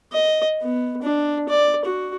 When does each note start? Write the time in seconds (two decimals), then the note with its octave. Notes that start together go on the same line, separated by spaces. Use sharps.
0.12 D#5
0.62 B3
1.02 D4
1.49 D5
1.85 F#4